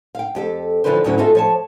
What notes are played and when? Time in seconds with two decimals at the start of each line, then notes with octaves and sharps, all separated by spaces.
0.15 F5 G5
0.35 F2 G4 A4
0.84 D3 E3 F3 D4 B4 C5
1.04 D2 G#2 F#3 C#4 E4
1.18 F4 F#4 G#4 A4 D#5 E5
1.35 F3 C#5 A5